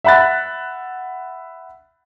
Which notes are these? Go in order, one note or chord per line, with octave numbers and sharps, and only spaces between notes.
E5 F#5 B5 F#6 A6